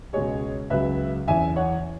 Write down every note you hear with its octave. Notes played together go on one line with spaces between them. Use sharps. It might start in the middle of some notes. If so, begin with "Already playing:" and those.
C#2 B2 G#3 G#4 C#5
C#2 C#3 F#3 B4 E5
F#1 E2 E3 E5 G#5
C#5 F#5